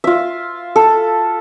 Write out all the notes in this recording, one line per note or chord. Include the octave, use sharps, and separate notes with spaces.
F4 E5
A4